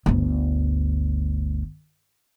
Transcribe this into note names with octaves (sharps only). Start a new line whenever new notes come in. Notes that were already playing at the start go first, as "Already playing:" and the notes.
G1 D2